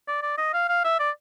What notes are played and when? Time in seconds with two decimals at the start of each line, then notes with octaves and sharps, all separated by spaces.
0.08 D5
0.23 D5
0.38 D#5
0.54 F5
0.69 F5
0.84 E5
1.00 D5